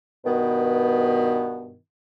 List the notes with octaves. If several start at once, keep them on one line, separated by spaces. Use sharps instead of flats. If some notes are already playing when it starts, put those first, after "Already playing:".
G2 B2 D#3 B3